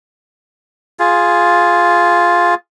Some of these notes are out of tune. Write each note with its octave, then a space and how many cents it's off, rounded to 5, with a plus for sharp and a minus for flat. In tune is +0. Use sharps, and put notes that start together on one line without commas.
F4 +0 G#4 +0